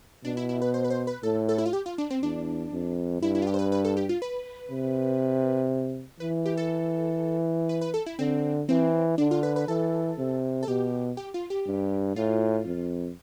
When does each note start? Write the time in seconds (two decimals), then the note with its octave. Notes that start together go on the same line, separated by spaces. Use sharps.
0.25 B2 D4
0.37 E4
0.49 E4
0.62 B4
0.74 C5
0.84 B4
0.90 C5
1.07 B4
1.23 A2 A4
1.49 A4
1.58 E4
1.66 F4
1.73 G4
1.86 F4
1.98 D4
2.10 C4
2.22 E2 D4
2.73 F2
3.22 G2 E4
3.35 E4
3.42 F4
3.47 G4
3.54 C5
3.59 B4
3.72 B4
3.85 A4
3.97 G4
4.09 F4
4.22 B4
4.71 C3
6.20 E3 B4
6.46 G4
6.57 A4
7.69 B4
7.81 B4
7.94 A4
8.06 E4
8.19 D3 C4
8.69 E3 C4
9.18 D3 D4
9.31 F4
9.43 B4
9.56 B4
9.68 E3 A4
10.18 C3
10.63 A4
10.68 B2 G4
11.17 G4
11.34 F4
11.50 G4
11.67 G2
12.16 A2 F4
12.66 F2